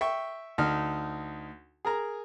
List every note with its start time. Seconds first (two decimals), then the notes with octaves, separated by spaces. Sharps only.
0.01 E5 G5 C#6
0.58 D2 D#4 F6
1.85 G#4 A#4 A#5